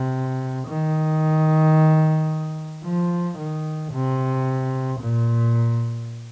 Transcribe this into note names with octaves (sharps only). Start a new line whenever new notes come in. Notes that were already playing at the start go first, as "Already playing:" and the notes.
Already playing: C3
D#3
F3
D#3
C3
A#2